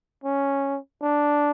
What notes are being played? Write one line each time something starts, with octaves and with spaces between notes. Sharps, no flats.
C#4
D4